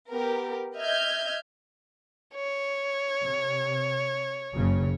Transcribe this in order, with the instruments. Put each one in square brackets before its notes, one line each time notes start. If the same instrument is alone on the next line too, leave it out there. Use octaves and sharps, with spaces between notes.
[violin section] B3 G4 A#4
D#5 E5 F6 G6 G#6
[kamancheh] C#5
[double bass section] C3
F#1 C#3